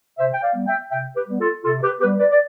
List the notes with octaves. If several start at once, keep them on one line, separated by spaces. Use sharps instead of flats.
C3 C5 E5
G5
D5 F5
G3 B3
E5 G5
C3 E5 G5
G4 B4
G3 B3
F4 A4
C3 F4 A4
G4 B4
G3 B3 G4 B4
B4 D5
D5